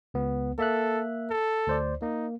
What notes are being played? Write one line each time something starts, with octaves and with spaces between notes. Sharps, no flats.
C#2 B3
A#3 A4 E5 F#6
A4
D2 C5 D5
A#3 D#4